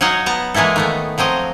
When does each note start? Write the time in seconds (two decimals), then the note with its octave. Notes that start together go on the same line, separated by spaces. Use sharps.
0.01 F#3 D#4 C#5 D#5 F5 F#5
0.26 B3 A5 A#5
0.54 E3 G#3 A#3 E4 A4
0.76 D#3 A3 B3
1.18 F3 F#3 C4 D#5